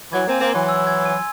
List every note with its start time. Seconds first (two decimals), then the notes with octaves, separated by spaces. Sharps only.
0.12 E3 F#3 G#6
0.26 A#3 C4 G#5
0.40 A#3 C4
0.49 E3 F#3 C6
0.68 E6
0.87 G#6
1.05 G#5